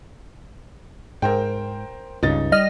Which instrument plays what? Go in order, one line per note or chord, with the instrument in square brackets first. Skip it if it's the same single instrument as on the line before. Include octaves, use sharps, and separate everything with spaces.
[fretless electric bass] G#2 [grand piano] A#4 C5 G5
[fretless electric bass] C#2 G2 C#3 [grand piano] D#4 A6
[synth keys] G3 D#5 F6